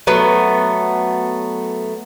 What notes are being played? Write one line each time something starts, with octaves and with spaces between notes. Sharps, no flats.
F#3 A3 B3